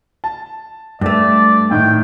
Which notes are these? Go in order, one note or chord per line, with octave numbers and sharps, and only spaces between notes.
A5
G2 A3 D5
A2 D#3 G5